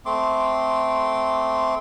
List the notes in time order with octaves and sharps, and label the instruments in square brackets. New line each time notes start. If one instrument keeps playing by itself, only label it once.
[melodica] A3 C4 C6 D6